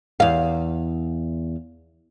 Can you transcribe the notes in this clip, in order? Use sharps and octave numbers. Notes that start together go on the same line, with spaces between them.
E2 F5